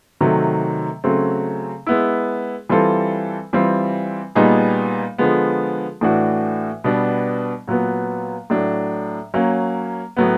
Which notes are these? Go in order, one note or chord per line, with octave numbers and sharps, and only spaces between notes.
C3 D#3 F#3 A3
C#3 F#3 A3 C4
G#3 B3 E4
E3 G3 C4 F4 A4
E3 G3 C4 F4
A#2 G3 B3 D#4 G#4
D3 F3 G#3 B3
A2 E3 A3 D4 F#4
B2 G3 B3 D4
A#2 F#3 B3
A2 F#3 A3 D4
F#3 A#3 C#4
A2 F#3 B3